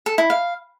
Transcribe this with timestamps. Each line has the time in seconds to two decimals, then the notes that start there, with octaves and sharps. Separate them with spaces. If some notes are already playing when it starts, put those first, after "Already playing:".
0.06 A4
0.18 E4
0.30 F5